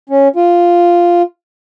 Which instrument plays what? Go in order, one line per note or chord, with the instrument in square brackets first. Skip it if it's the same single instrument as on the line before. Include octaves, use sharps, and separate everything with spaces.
[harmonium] C#4
F4